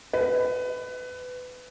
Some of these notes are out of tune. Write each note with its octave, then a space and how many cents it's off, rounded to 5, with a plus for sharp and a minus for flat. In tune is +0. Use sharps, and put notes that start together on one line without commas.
B4 +20